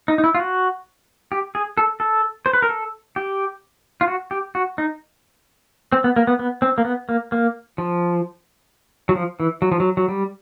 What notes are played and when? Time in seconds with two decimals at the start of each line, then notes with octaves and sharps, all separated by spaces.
0.08 D#4
0.18 D#4
0.24 E4
0.35 F4
0.39 F#4
1.32 G4
1.55 G#4
1.78 A4
2.00 A4
2.46 C5
2.53 B4
2.62 A#4
2.69 A4
3.16 G4
4.01 F4
4.08 F#4
4.31 G4
4.55 F#4
4.78 D#4
5.92 C4
6.04 B3
6.16 A#3
6.27 B3
6.39 B3
6.62 C4
6.78 A#3
6.85 B3
7.09 A#3
7.32 A#3
7.78 F3
9.09 F#3
9.16 F3
9.40 E3
9.62 F#3
9.72 F3
9.80 F#3
9.97 F#3
10.09 G3